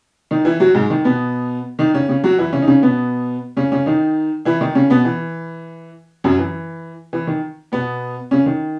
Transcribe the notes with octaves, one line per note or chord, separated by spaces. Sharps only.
D#3 D#4
E3 E4
F#3 F#4
G#2 G#3
D#3
B2 B3
D#3 D#4
C#3 C#4
C#3 C#4
F#3 F#4
E3 E4
C#3 C#4
D#4
C#3 C#4
B2 B3
C#3 C#4
C#3 C#4
D#3 D#4
E3 E4
D#3 D#4
C#3 C#4
B2 B3
E3
F#2 F#3
E3
E3
D#3
B2 B3
C#3 C#4
D#3